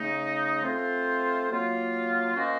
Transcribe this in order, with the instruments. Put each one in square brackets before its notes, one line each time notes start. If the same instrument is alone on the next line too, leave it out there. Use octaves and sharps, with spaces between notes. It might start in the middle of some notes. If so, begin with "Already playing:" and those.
Already playing: [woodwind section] C#3 A3 D#4
A3 C4 F4 C5
F#3 A#3 F4
A#3 C#4 F#4 C5 D#5